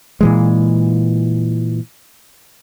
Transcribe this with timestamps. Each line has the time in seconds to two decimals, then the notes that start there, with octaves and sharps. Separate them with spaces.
0.21 A#2 E3 G#3